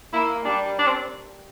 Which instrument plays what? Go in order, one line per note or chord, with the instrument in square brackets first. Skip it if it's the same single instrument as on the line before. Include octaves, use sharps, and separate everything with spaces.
[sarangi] A#3 [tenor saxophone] E4
[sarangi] G3 [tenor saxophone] D4
[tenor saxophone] D4
C4